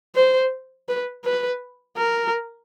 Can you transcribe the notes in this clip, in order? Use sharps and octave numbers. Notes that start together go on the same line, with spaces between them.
C5
B4
B4
A#4